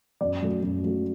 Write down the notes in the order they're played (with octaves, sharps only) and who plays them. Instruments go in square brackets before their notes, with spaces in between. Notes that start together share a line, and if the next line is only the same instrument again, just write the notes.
[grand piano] F#2 D5
F#3 A3
F#2
F#3 A3